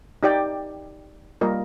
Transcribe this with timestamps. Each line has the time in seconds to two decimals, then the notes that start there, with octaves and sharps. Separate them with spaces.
0.23 D#4 G4 D5 G5
1.41 G3 A#3 F4 A#4 D#5